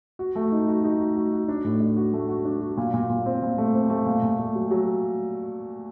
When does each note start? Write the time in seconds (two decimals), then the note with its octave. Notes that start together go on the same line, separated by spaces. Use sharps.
0.19 F#4
0.35 A3
0.52 D#4
0.68 F#4
0.84 D#4
1.00 F#4
1.16 F#4
1.33 F#4
1.48 D4
1.64 A2
1.80 D4
1.97 F#4
2.13 A3
2.28 F#4
2.45 D4
2.61 F#4
2.77 A#2
2.93 A#2
3.10 A#2
3.26 C4
3.42 A#2
3.58 A3
3.74 C4
3.90 A3
4.06 A#2
4.23 A#2
4.39 A3
4.55 F#3
4.71 F#3